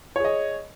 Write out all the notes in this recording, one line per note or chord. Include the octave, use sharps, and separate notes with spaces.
G#4 C#5 D#5